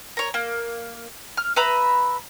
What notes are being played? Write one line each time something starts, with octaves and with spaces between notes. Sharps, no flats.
A#4 C#5
A#3
F6
B4 E5 A#5 B5